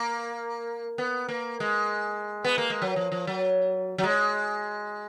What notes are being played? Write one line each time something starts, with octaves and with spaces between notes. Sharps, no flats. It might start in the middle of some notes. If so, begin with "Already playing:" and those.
Already playing: A#3
B3
A#3
G#3
B3
A#3
G#3
F#3
F3
F3
F#3
F#3
G#3